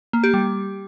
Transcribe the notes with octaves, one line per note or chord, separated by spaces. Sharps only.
A#3
G4
G3